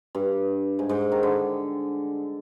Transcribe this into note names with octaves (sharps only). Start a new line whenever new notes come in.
G2
G#2
G#2
D#3
D3